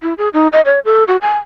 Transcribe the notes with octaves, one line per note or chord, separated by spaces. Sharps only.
E4
G#4
D#4
D#5
C#5
A4
F#4
G#5